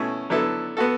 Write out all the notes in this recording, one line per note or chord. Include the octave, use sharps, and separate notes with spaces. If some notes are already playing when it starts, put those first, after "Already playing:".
Already playing: B2 A3 C#4 E4
D3 F#3 B3 E4 A4
B3 F#4 A4